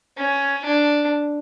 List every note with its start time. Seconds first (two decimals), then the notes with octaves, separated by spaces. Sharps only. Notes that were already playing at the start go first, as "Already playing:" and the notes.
0.18 C#4
0.65 D4